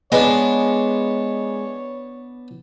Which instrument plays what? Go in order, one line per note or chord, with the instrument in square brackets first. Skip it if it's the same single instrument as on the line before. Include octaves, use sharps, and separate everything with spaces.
[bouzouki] G#3 [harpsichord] B3 D4 [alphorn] C#5